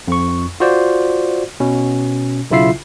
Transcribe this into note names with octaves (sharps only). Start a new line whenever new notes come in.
F2 C#6
F4 F#4 C5 D5
B2 C#4
B1 C#3 E4 F4 E5 C7